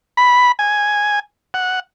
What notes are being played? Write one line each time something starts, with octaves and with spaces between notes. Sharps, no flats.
B5
G#5
F#5